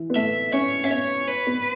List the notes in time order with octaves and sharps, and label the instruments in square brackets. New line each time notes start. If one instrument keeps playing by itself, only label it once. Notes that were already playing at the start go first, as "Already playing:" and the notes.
Already playing: [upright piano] E3
B3
[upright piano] A3 [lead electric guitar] E5
[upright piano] C#4 [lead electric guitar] C#5
[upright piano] C#4 [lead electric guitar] E5
[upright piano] B3 [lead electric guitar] C#5
[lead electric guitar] B4
[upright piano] B3